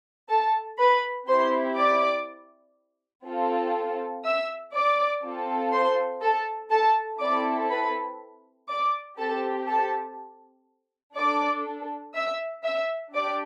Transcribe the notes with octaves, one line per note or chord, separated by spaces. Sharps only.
A4 A5
B4 B5
C4 E4 G4 C5 C6
D5 D6
C4 F4 A4
E5 E6
D5 D6
C4 F4 A4
C5 C6
A4 A5
A4 A5
C4 E4 A4 D5 D6
B4 B5
D5 D6
C4 G4 A4 A5
A4 A5
D4 A4 D5 D6
E5 E6
E5 E6
D4 G4 D5 D6